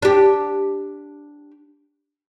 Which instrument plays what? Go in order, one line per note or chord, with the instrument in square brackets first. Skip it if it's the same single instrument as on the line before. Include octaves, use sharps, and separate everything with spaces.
[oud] D4 G4